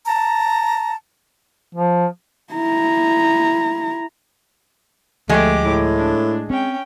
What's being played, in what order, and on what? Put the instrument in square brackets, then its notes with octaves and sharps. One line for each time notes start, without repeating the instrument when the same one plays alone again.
[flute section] A5 A#5
[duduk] F3
[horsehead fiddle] E4 A#5
[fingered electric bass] D2 F3 [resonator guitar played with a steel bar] G#3 [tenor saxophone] A3 [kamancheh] G4 D6
[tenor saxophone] A2
[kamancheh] D4
[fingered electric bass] C4 [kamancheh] C#4 G5